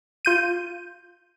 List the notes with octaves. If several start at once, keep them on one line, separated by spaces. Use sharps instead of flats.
F4 G6 D#7